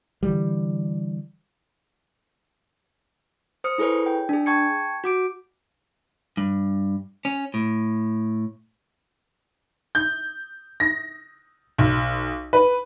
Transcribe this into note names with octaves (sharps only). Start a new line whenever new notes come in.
D3 E3 G3
C5 D#6 F6 C#7
E4 G#4 A4 B4 C#5
G5
D4 G#4
G5 A5 C#6 G#6 C#7
F#4 D6 D7
G2
C#4
A2
G6
A#6
B1
B4